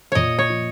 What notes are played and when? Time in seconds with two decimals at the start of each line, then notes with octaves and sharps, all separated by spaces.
0.12 A#2 C#5 D#5
0.39 C#5
0.50 F3